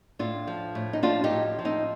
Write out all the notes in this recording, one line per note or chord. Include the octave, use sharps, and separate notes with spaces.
A2 D4 F4
F3
A2
D#4
F3 D4 F4
D#4 G4
A2
F3
C4 D#4